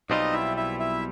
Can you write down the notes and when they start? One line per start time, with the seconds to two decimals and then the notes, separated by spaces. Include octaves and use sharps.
0.10 B1 B2 G3 C4 D#4 F4 D#5
0.33 E4 E5
0.57 E4 E5
0.79 E4 E5